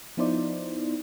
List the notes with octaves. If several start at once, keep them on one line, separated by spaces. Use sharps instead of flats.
F3 B3 D#4 E4 C5 D5